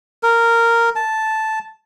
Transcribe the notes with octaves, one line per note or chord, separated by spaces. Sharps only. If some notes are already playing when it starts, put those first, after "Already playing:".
A#4
A5